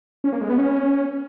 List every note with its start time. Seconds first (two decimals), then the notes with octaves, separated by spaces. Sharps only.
0.24 C#4
0.32 A#3
0.41 G#3
0.50 B3
0.58 C#4